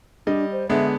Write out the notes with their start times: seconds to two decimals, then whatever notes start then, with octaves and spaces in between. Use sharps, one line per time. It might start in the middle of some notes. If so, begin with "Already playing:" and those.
0.27 G3 D4 D#5
0.52 C5
0.69 D3 G#3 B3 E5